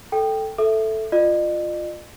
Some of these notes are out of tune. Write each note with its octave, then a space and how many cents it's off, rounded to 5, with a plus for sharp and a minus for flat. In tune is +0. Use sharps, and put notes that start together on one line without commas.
A4 +0 G5 +0
A4 +0 E5 +0 D6 +40
F4 +0 D#5 -45